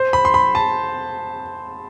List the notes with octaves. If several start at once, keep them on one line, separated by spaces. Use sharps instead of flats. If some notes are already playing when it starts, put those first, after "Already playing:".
Already playing: C5
B5
C6
B5
A5